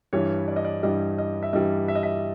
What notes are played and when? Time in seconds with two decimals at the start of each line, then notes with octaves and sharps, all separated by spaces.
0.13 G2 E3 G3 C#5
0.48 D5
0.56 D#5
0.65 D5
0.83 G2 E3 G3 D#5
1.18 D#5
1.43 E5
1.53 G2 E3 G3 D#5
1.88 E5
1.95 D#5
2.03 E5